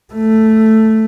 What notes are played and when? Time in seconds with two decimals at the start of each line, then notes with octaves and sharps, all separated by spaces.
0.14 A3